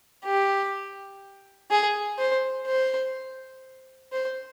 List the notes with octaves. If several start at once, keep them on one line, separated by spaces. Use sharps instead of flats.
G4
G#4
C5
C5
C5